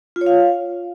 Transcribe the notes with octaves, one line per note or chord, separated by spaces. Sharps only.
F4
C#5
F5